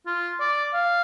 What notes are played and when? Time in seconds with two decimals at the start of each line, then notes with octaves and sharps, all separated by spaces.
0.06 F4
0.40 D5
0.74 F5